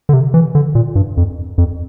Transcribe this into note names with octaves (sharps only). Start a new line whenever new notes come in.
D3
C3
E3
D3
A#2
G2
F2
F2